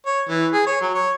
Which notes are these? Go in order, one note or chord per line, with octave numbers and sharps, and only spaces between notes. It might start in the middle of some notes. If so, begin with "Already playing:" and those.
C#5
E3
G#4
C#5
F#3
C#5